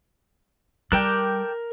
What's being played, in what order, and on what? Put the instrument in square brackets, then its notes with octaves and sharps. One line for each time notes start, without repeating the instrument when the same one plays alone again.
[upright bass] G3 [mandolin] A4 D5 G5 [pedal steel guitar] A#4 F#6